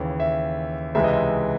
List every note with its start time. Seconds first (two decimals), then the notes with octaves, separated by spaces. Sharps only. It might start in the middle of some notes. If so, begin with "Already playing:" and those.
Already playing: D#2 C#3 E3
0.20 E5
0.95 C#2 C3 E3 G#3 E5
1.04 D#5
1.13 E5